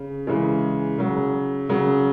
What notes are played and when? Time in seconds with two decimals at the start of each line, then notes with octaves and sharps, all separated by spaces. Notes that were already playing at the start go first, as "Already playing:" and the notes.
Already playing: C#3
0.27 C#3 E3 G#3
0.98 C#3 F#3
1.69 C#3 F#3